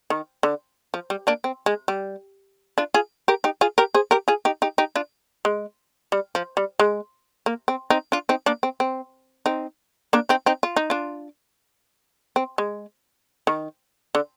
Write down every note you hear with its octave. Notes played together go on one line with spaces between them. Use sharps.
D#3
D3
F3
G3
A#3 D4
C4
G#3
G3
D4 F4
F4 G#4
G4 A#4
D#4 G4
F4 G#4
G4 A#4
G#4 C5
G4 A#4
F4 G#4
D#4 G4
D#4 G4
D#4 G4
D4 F4
G#3
G3
F3
G3
G#3
A#3
C4
C4 D#4
D4 F4
C4 D#4
A#3 D4
C4
C4
C4 D#4
A#3 D4
C4 D#4
C4 D#4
F4
D#4
D4 F4
C4
G#3
D#3
D3